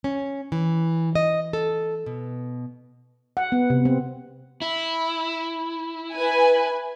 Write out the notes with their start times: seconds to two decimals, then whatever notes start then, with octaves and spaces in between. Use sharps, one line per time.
0.04 C#4
0.52 E3
1.15 D#5
1.53 A4
2.06 B2
3.37 F#5
3.52 B3
3.70 C3
3.85 C4
4.62 E4
6.12 B4 G#5